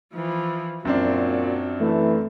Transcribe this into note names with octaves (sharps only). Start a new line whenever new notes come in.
E3 F3
F#2 A#2 F#3 C4 D4
E3 A3